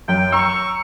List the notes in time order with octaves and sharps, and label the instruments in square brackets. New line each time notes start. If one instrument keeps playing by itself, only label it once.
[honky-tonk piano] F#2 [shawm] G5
[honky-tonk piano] A#5 E6 [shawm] C#6